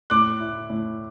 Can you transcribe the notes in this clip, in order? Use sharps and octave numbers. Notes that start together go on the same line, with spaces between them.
A2 D6 F#6
E4
A2